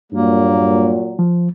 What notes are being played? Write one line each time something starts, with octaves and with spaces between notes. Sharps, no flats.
G2 A#2 F#3 A#3
F3